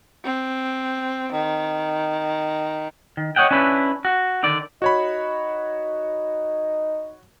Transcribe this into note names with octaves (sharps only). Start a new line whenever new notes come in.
C4
D#3
D#3
C#5 D#5 F#5 G5
C#4 D4 E4 B4
F#4
D3 D#3 D5
D#4 F#4 C#5 B5